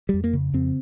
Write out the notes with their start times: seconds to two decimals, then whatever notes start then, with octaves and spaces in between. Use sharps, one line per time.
0.09 F2 G3
0.24 A#3
0.33 C#3
0.54 F2 C4